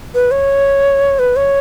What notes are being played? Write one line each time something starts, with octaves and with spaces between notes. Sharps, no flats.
B4
C#5
B4
C#5